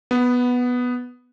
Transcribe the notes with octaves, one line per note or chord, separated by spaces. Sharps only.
B3